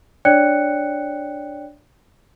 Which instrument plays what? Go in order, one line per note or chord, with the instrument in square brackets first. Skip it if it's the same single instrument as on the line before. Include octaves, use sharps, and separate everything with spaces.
[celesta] D4 C#5 D5 G5 F#6 C#7